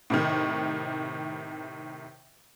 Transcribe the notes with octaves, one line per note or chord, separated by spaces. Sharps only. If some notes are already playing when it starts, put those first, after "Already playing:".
A2 C3 D#3